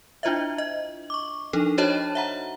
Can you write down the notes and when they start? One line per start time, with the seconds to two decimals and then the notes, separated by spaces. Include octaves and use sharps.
0.23 D4 E4 F4 C5 D#5 E5
0.58 D#5
1.10 C#6 D6
1.53 F3 D4 D#4 A4
1.78 D4 F#4 C5 C#5 D#5 A5
2.15 E5 F#5 A#5